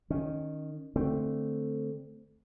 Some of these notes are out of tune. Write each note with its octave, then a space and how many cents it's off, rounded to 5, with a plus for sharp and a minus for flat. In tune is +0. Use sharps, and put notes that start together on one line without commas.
D#3 -15 C#4 +0
D3 +0 A3 +0 C4 +0